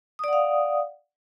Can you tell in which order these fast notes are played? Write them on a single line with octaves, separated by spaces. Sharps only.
D#6 D5 F#5 F5